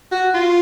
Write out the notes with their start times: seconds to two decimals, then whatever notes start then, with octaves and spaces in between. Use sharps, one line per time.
0.12 F#4
0.34 F4